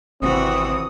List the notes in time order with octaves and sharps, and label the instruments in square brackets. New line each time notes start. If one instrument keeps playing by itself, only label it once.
[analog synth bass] G#1 [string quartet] C3 E3 F#4 [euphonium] C4 [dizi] D#6